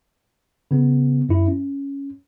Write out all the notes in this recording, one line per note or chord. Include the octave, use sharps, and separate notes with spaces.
C#3 B3
F#2 E4
C#4